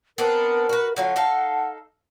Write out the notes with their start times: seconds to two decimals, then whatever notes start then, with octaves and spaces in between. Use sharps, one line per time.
0.18 B3 C4 D4 A#4
0.69 F#4 B4
0.96 D3 F#3 F4 F#5
1.16 D#4 A4 F5